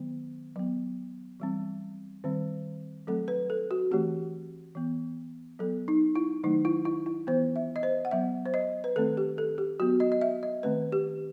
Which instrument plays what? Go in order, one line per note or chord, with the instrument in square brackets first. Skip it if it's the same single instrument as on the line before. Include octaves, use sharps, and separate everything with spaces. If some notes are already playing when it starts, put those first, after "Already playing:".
Already playing: [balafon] D#3 F#3 B3
F#3 B3
E3 G3 C4
D#3 G3 C4
F#3 A3 C4 A4
B4
A4
F#4
E3 A3 C4 G4
E3 B3
F#3 B3 A4
D#4
E4
D#3 F#3 A3 D#4
E4
E4
E4
E3 B3 C5
E5
D#5
C5
F#5
F#3 B3 E5
C5
D#5
B4
D#3 A3 C4 A4
G4
A4
G4
F#3 B3 F#4
D#5
D#5
E5
D#5
D#3 A3 C4 B4
G4